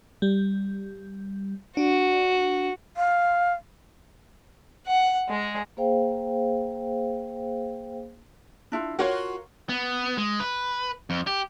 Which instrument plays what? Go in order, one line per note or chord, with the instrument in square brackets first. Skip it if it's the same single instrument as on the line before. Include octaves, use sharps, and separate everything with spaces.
[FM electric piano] G3
[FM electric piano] D4 [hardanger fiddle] F#4
[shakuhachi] F5
[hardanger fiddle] F#5
G#3 G#4
[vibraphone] A#3 G#4 C5 F5 G5
[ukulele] D4 E4 F4
[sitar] F4 F#4 [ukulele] A#4 C#5
[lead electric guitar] B3
G#3
B4
F2
G4